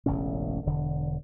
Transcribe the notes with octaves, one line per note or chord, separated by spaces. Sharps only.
E1 A1 C#3 C#4
E1 D3